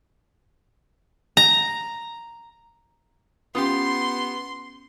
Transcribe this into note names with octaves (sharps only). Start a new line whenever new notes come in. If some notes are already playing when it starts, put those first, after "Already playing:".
A#5
B3 C#4 F4 G4 C6 D#6